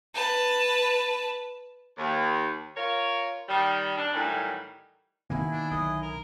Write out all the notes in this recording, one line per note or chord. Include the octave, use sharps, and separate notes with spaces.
B4 A5
D#2
F4 A#4 C#5
D#3 G3
D4
A2 D#3 E3 F#3 G3
B2 D#3 A#3 E4 G#5
D4
B1 D3 D#5
A#4